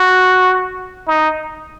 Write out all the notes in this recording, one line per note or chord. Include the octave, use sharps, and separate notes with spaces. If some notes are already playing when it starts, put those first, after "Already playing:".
Already playing: F#4
D#4